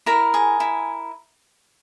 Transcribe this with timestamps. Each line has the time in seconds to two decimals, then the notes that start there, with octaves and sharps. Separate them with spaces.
0.06 E4 A#4 A#5
0.34 G#4
0.60 E4